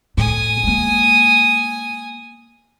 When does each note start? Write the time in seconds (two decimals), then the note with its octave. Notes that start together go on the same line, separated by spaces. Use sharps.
0.17 A2 G#5 D#6
0.63 G#3 A#3